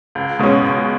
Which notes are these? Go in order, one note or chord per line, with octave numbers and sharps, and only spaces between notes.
C#2
B2 G#3 C#4
C#2